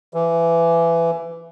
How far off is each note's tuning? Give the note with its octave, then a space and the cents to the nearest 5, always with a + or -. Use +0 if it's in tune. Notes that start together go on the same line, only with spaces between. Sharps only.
E3 +20